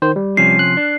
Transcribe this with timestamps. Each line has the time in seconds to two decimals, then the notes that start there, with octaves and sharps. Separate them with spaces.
0.02 D#3 C5
0.16 G3
0.37 C3 F3 C#4 C7
0.59 F#6
0.77 D4